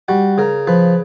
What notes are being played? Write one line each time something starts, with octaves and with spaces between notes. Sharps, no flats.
G3 F#4
C#3 A#4
F3 B4